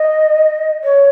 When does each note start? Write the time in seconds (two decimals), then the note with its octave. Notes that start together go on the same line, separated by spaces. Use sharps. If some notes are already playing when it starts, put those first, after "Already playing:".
Already playing: D#5
0.84 C#5